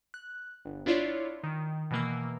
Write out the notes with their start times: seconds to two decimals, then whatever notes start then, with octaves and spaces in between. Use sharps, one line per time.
0.14 F#6
0.65 G1
0.86 D4 E4 F4 C#5 D5
1.43 D#3
1.91 B2 E3 A#3 E6